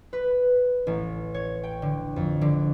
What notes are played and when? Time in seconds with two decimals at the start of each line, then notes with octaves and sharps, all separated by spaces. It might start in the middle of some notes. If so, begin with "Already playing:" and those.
0.13 B4
0.87 A1
1.34 C#5
1.64 G5
1.82 D3
2.16 F2
2.41 D3